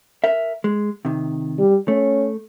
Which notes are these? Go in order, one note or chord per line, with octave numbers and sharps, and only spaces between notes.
A#4 E5
G#3
C3 D#3
G3
A3 C#4